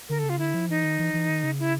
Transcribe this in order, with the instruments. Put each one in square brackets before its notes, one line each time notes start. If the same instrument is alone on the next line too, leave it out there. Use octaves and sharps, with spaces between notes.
[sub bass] D3 [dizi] A#4
[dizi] A4
[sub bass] C#3
[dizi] F4
[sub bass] D3 [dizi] E4
[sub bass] F3
[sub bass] E3 [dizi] D#4
[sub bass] D#3
E3
E3
D#3
C#3
[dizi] E4